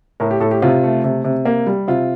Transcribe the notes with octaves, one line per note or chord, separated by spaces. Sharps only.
A2 A#4
G4
A2 A4
G4
C3 F4
A3
C3
C3
A#3
G3
C3 F4